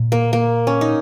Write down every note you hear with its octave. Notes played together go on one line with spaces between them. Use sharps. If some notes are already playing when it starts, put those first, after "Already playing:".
Already playing: A#2
A#3
A#3
C#4
D#4